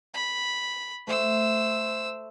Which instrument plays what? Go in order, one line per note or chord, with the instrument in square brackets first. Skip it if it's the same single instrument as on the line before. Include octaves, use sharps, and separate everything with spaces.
[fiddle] B5
[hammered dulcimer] A3 [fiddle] C5 E6